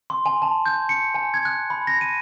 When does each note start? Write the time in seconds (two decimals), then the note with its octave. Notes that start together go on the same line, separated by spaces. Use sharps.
0.10 C6
0.26 G#5
0.42 A5
0.66 G6
0.89 C#7
1.15 G#5
1.34 G#6
1.45 F#6
1.70 B5
1.87 A#6
2.01 D#7